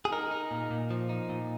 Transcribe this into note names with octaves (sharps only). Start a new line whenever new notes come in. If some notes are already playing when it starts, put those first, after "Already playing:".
G#4
D#4 A#4
D#4
A#2
A#2
F3
D#4
A#2